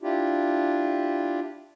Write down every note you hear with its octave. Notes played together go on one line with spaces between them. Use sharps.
D4 E4 F4 G4